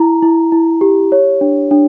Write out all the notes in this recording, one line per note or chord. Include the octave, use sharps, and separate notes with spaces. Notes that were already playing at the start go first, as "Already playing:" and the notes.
Already playing: E4 A#5
E4
E4
G4
C#5
D4
D4